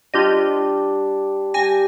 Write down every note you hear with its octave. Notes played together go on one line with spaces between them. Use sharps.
G3 D4 F4 G4 D#5
G3 G4 G#5 A#6